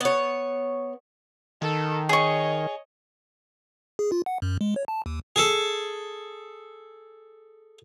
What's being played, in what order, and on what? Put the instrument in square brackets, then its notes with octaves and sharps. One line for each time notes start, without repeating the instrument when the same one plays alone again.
[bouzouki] B3 C#5
[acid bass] D#3 [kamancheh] A4
[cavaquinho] G#4 C#6 [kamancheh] C#5 D#5
[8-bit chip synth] G#4
F4
F#5
F#2
G#3
C#5
A5
D#2
[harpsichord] G#4 A4